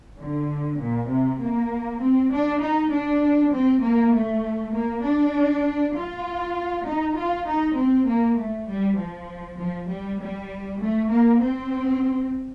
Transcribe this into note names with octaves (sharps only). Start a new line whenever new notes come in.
D3
A#2
C3
A#3
C4
D4
D#4
D4
C4
A#3
A3
A#3
D4
F4
D#4
F4
D#4
C4
A#3
A3
G3
F3
F3
G3
G3
A3
A#3
C4